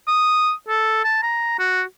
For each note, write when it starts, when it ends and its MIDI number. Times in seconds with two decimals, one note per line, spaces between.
0.08 0.52 87
0.69 1.00 69
1.04 1.22 81
1.23 1.56 82
1.59 1.82 66